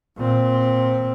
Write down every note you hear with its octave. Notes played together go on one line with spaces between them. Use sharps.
A#2 C4